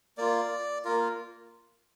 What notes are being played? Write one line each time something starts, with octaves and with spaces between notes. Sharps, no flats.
A#3 F4 D5
A#3 F4 A#4